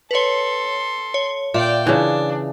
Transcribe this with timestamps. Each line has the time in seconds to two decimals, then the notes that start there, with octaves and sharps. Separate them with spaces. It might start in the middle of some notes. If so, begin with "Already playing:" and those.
0.11 A4 B4 C#5 C6
1.14 C#5
1.54 A#2 D5 E5 F5 G5
1.87 C#3 E3 D4